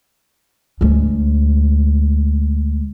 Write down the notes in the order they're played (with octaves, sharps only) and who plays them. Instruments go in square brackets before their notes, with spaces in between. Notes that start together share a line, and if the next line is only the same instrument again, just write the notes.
[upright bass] D2 G#3